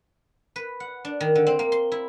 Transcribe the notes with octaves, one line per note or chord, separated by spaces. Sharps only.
B4
F#5
D4
D#3
D3
C4
A#3
C6
E4